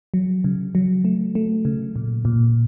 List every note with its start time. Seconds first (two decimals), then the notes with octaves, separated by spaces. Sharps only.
0.14 F#3
0.44 C#3
0.75 F#3
1.05 A3
1.35 A3
1.65 C#3
1.96 A#2
2.25 A#2